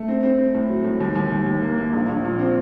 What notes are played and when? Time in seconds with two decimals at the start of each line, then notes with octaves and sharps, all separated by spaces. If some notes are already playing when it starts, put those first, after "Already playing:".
Already playing: A3
0.08 C4
0.23 C4
0.38 C4
0.54 A2
0.69 F#3
0.84 A2
1.00 D#2
1.15 D#2
1.32 D#2
1.46 D#2
1.62 A#3
1.78 A#3
1.93 A#1
2.08 A#1
2.24 A#2
2.39 C4